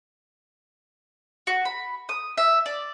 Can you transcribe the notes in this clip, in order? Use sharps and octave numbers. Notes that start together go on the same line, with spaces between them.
F#4
B5
D#6
E5
D5